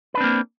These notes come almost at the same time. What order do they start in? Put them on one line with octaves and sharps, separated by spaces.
B4 D4 C4 A#3